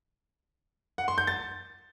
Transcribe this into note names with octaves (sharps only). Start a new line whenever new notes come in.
F#5
C6
G6
A6